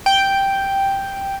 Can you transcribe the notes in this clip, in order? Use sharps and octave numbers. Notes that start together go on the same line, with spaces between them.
G5